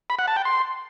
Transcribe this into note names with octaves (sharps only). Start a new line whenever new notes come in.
B5
F#5
A5
G5
C6